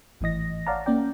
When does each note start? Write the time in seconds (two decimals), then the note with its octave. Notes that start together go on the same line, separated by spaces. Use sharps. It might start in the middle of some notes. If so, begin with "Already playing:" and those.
0.21 G#1 A2 E3 D#5 A#6
0.67 C#5 D5 F5 F#5 A5 A#5
0.86 A#3 C#4 D5 G5